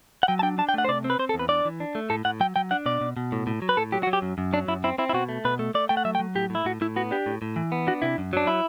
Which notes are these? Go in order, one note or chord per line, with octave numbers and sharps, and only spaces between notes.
F#5
F#3 G5
A5
D4 G5
D4 A5
G5
A3 F#5
C5
C3 D5
C4
B4
C4 C5
A4
E2
B4
D4 D5
E3
D4
A3
A2 A4
A2 F#5
F#3 G5
F#3 G5
D4 F#5
B2 D5
B2
B2
A2
A2
F#3
B4
A2 A4
F#3 G4
F#4
F#3
G4
F#2
F#2
F#3 D4
F#2 E4
C4 E4
C4 E4
E4
B2 F#4
A3
B2 B4
A3
A3 D5
A3 G5
F#5
F#3 E5
G5
F#3
A2 G4
A2 E4
A2 F#4
A2 E4
B3 F#4
D4 G4
A2
A2
E3
B3
D4 F#4
C3 E4
F#2
F#3 D4
E4